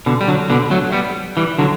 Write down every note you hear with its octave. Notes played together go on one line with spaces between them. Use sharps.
B2 D3
G3
D3 F#3
B2 D3
F#3 A3
G3 B3
E3 G3
D3 F#3